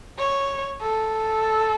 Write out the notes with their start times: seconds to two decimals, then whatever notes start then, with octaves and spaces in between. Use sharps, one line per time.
0.19 C#5
0.82 A4